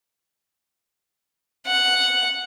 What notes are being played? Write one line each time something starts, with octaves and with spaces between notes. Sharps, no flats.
F#5